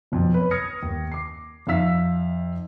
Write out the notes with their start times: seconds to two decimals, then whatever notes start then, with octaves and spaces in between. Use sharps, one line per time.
0.12 B1 F2
0.34 B4 C#5
0.51 D#6 F6 G#6 A#6 C#7
0.83 D#2
1.12 D6 C7
1.67 F2 D#4 E5 F5 E6 B6